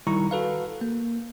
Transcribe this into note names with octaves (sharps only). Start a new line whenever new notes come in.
D#3 G3 E4 A#5 C#6
F#4 A4 B4 F5
A#3